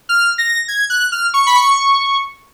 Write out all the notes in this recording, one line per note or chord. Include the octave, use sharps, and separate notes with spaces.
F6
A#6
G#6
F#6
F6
C#6
B5
C#6